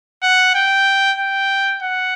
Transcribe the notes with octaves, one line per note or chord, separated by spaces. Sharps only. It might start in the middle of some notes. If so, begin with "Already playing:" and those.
F#5
G5
G5
F#5